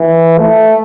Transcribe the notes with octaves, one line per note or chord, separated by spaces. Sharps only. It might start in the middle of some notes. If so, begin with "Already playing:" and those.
Already playing: E3
A3